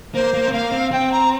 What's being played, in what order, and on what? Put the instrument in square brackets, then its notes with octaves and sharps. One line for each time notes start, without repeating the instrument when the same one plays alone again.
[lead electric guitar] A#3 [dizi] C5
[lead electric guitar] A#3
C4
[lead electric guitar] A#3 [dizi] F5
[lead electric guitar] C4
[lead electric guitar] C4 [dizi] G5
[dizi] A#5